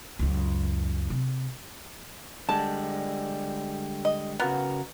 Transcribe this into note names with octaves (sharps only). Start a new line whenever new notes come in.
C#2 F#2
C3
D3 G3 G#3 A5
D#5
C#3 B3 F#4 A#4